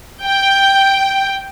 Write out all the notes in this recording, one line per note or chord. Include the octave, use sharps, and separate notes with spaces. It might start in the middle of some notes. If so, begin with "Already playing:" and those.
G5